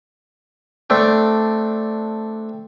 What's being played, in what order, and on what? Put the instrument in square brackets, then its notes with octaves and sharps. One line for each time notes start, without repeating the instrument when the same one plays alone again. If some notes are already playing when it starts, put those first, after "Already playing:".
[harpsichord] A3 C4 D4